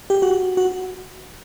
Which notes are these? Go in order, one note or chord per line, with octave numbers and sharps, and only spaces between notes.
G4
F#4
F#4